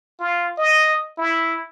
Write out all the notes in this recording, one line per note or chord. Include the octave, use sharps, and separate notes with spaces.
F4
D#5
E4